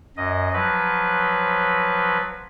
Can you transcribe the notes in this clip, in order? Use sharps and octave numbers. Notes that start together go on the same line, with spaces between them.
F#2 D#5
F3 F#3 B4